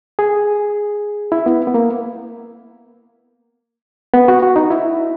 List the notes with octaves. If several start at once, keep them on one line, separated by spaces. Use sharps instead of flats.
G#4
E4
B3
B3
A#3
B3
F#4
F#4
D#4
E4